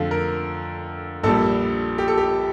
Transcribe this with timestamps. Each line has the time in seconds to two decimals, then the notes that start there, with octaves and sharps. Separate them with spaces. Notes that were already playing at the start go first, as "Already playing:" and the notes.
Already playing: F2 D3 A3 F5
0.11 A#4
1.23 A#1 A#2 G3 A4
1.98 G4
2.08 A4
2.17 G4